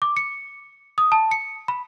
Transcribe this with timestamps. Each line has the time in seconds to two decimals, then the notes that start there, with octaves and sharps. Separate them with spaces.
0.02 D6
0.17 C#7
0.98 D#6
1.12 A5
1.31 C#7
1.68 B5